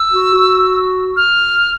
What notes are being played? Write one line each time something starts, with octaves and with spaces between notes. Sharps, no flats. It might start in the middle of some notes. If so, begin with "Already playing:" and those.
Already playing: E6
F#4
F#4
F6